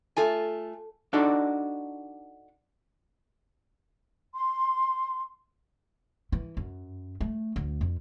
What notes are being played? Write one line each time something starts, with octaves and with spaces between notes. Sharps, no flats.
A3 F4 A4 G#5 A5
D4 D#4 F#4 A4 D5
C6
E3
F#2
A3
D2
F2